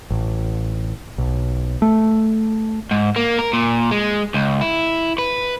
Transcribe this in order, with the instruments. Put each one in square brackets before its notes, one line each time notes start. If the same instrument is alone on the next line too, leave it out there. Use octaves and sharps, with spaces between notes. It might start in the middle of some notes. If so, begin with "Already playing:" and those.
[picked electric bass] A1
B1
A3
[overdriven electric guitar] G#2
A#3
A#4
A#2
G#3
C#2
E4
B4